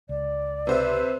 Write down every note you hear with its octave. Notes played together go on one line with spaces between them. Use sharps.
C#2 D5
C3 B4 C5 E5